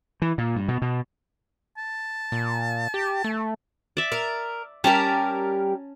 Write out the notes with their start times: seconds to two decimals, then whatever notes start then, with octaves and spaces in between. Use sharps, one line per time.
0.22 E3
0.38 A#2
0.56 G2
0.68 B2
0.82 B2
1.77 A5
2.32 A#2
2.94 G4
3.24 A3
3.97 D5 E5
4.12 A#4
4.84 G3 C#4 G4 A#4 A5 A#5